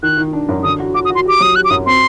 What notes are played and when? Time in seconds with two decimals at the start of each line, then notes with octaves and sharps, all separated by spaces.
0.03 D#3 F#6
0.18 D#3
0.33 D4
0.49 F#2
0.63 D3 D#6
0.80 F#4
0.95 F#4 D6
1.05 D#6
1.10 F#4
1.15 C6
1.25 G4 D6
1.40 F#3 D#6
1.56 G4 F#6
1.64 D6
1.70 F#2 D#6
1.86 C4 C6